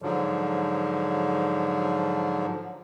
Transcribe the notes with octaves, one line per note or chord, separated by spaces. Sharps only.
G#2 D3 F3 F#3